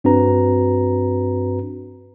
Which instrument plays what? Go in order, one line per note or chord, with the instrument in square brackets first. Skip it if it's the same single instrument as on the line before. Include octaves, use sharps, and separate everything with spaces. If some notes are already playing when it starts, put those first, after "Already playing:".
[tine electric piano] G2 C4 D4 F#4 B4 A#5